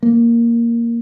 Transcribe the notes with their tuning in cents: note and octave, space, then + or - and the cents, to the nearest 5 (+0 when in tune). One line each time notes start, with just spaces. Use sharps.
A#3 +0